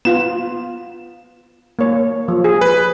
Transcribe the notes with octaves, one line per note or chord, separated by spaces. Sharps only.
B3 F4 E7
A#3 C#5
F3
G#4
B4